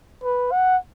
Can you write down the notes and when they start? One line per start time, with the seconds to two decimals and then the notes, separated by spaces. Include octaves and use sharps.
0.23 B4
0.52 F#5